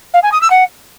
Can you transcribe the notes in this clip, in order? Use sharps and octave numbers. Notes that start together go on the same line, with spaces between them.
F5
G#5
D#6
E6
F#5